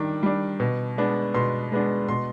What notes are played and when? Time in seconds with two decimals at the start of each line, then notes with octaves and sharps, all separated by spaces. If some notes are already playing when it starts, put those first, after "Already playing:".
Already playing: D#3 G3 D4 D6
0.23 G3 D4
0.60 B2
0.97 G#3 B3 D4
1.34 B2 C6
1.72 G#3 B3 D4
2.09 B2 C6